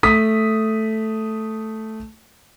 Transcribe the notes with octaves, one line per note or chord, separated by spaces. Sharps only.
A3 D#6 B6